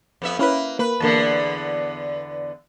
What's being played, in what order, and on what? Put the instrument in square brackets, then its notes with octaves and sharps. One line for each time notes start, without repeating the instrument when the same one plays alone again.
[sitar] F2 B3 E5
[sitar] A#3 [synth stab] C#4 E4 B4
[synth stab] A#3 [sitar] B4
[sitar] E2 D3 B3 [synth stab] A#3 A5